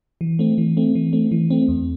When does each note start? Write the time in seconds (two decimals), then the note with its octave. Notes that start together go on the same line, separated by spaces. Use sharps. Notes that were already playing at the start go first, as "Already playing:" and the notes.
0.21 E3
0.39 A3 C4
0.58 E3
0.77 A3 C4
0.95 E3
1.13 A3 C4
1.31 E3
1.50 A3 C4
1.68 E2